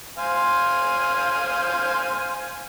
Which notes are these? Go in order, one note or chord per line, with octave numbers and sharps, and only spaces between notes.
C5 F5 G#5